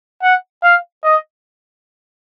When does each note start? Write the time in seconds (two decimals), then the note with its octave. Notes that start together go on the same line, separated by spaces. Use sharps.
0.22 F#5
0.63 F5
1.04 D#5